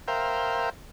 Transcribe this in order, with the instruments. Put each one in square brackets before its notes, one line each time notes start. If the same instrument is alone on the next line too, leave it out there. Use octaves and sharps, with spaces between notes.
[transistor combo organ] A#4 C5 E5 F5 G5